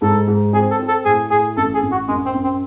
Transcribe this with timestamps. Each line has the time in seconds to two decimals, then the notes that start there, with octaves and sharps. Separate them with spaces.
0.02 G#2 A4
0.28 G#2
0.53 C4 G#4
0.71 A4
0.79 C4
0.88 A4
1.05 A2 G#4
1.31 A2 G#4
1.57 A1 A4
1.74 G#4
1.82 A1
1.91 F#4
2.08 F#2 G#3
2.26 C4
2.34 F#2
2.43 C4